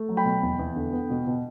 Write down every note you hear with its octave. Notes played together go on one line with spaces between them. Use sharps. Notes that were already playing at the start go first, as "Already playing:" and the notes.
Already playing: A3
F#3
G5 B5
B2
E2
E2
D3
B3
B2
B2